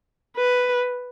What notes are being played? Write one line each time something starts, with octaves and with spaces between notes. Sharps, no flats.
B4